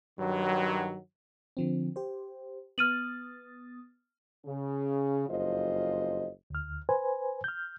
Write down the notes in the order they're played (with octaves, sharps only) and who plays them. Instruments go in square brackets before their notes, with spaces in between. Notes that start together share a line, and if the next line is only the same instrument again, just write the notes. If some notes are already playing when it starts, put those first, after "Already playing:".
[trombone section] G2 D#3 F#3
[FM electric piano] D3 F3 C4
G4 C5
[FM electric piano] B3 D#6 A6 [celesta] F6 D#7 F#7
[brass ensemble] C#3
F#1 F2 F4 C5 D#5
[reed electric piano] D2 F6
B4 C5 G#5
F6 G6